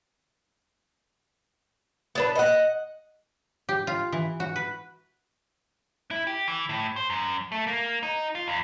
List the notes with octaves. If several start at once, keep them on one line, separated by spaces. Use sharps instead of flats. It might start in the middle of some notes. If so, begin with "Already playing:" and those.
B3 D4 B4
D#5 F#5
G4
F4
E3
F#4
B4
E4
G4
E3
A2
C5
F#2
A3
A#3
D#4
F4
E2